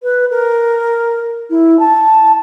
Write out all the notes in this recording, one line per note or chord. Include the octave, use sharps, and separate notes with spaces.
B4
A#4
E4
A5